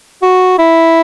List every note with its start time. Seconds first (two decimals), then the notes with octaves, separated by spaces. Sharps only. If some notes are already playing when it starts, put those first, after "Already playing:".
0.22 F#4
0.59 E4